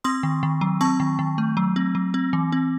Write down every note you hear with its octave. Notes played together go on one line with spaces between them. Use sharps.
C4 C6 D#6
D#3
D#3
F#3
C4 A5 C#6
D#3
D#3
A3
F#3
C4
F#3
C4
E3
C4